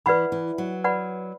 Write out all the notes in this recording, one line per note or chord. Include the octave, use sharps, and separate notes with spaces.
E3 B4 D5 F#5 B5
E3
F#3
B4 D5 F#5 B5